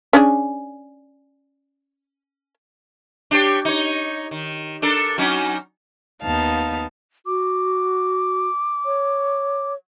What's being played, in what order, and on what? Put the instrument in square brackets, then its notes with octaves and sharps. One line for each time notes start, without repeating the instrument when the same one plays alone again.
[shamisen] C#4 D4 G#4
[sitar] D4 G4 C#5
D#4 C#5
D#3
D4 A4 A#4
F#3 C#4 D#4
[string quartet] D#2 B3 D#4 F5 A5
[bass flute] F#4 [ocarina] D6
[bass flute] C#5